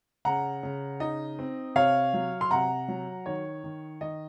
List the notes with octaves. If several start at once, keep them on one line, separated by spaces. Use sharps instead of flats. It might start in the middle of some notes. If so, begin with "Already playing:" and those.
C#3 F#5 A#5
C#3
D#4 D#5
C4
C3 C#5 F5
F#3
C6
C3 F#5 A#5
F#3
D#3 C#5
D#3
D#3 D#5